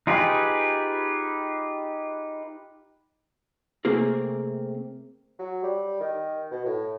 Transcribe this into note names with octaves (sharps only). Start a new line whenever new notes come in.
D#4 F4 G4 G#4 B4
C3 A3 A#3 C4 G#4 A#4
F#3
G3
D#3
B2
A2